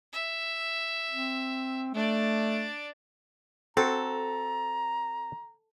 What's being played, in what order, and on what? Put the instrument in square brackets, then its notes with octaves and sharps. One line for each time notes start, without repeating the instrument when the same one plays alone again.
[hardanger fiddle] E5
[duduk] C4
[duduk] A3 [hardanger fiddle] D4 D5
[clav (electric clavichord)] C4 F#4 [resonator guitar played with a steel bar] A4 [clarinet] A#5